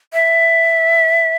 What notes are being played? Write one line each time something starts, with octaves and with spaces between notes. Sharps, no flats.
E5